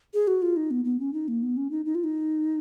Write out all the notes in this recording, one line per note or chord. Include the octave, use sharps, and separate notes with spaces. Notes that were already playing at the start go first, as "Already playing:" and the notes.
G#4
F#4
F4
D#4
B3
B3
C#4
D#4
A#3
B3
C#4
D#4
D#4
F4
D#4